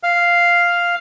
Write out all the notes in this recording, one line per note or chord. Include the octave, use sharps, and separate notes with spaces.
F5